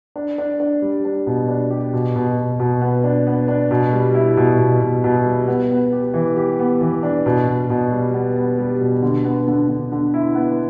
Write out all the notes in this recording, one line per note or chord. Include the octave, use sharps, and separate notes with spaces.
D4
D4
D4
G3
D4
B2
D4
G4
B2
B2
B2
B2
B3
D4
B3
D4
B2
G3
E4
B2
B2
B2
B2
G3
B3
B3
G4
E3
G4
B3
E3
D4
B2
B2
B2
G3
B3
B3
G3
B2
D3
B3
D3
D3
D3
E4
B3